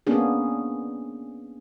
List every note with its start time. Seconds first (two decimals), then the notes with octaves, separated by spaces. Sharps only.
0.07 A#3 B3 C#4 D4 G#4